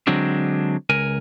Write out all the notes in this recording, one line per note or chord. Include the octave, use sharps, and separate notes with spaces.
D3 F#3 G#3 C4 D4
C#2 A#4 G#5